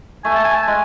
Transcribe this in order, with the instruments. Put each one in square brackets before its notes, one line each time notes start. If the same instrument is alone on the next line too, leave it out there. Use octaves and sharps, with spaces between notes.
[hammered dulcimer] A3 [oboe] G#5
[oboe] A5
G#5
A5
[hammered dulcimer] G#3 [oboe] G#5